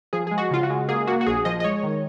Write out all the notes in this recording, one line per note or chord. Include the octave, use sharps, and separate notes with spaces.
F3 G#4
G#3 G#4
F#4
C#3 F4
F#4
G#3
A#3 G#4
A#3 F#4
F#4
A#1 G#4
F3 D#5
D#5
G#3 C#5
D#3